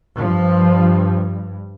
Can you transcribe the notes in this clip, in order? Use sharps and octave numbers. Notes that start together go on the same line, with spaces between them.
G2 F3